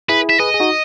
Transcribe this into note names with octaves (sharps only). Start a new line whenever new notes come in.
E4 G#4 B4
E5
G#4 B4 D#5
G#4
D#4 F#4